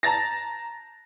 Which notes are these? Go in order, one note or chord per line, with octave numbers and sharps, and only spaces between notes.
A5 A#5 A6 A#6